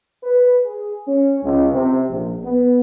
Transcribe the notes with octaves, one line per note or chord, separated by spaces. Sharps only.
B4
G#4
C#4
C#2
C3
A#1
B3